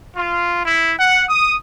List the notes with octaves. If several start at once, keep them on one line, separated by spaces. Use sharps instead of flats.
F4
E4
F#5
D#6